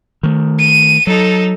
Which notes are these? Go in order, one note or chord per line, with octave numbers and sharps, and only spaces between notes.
D#3 A3
D#7
F#3 D#4 A4